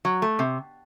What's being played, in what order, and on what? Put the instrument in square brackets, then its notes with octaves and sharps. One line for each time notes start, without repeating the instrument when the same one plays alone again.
[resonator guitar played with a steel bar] F#3
A3
C3